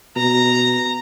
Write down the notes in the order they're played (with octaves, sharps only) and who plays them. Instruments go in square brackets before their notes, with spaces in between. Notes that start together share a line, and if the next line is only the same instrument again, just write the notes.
[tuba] B2 [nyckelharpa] A#5